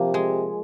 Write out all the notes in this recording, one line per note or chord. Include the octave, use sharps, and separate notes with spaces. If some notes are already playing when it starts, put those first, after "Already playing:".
Already playing: C3 F3 A#3
G#3